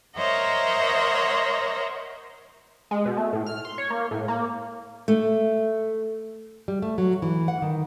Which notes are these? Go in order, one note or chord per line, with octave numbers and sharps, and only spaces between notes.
A#4 C5 C#5 D#5 E5 F#5
G#3
B2
A3
A2
F6
C6
C#5
A#3
A2
A#3
A3
G3
A3
F#3
E3
F#5
D#3